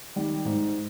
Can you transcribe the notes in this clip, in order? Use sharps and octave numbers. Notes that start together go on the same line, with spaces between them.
D#3 G3
G#2